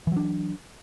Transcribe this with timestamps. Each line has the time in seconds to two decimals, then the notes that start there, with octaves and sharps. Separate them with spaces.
0.07 E3
0.12 F#3
0.17 D4